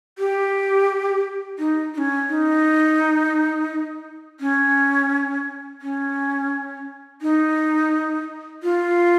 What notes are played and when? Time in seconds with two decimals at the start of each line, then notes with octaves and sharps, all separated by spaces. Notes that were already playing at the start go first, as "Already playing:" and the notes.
0.18 G4
1.59 D#4
1.94 D#4
1.98 C#4
2.29 D#4
4.40 C#4
5.82 C#4
7.22 D#4
8.63 F4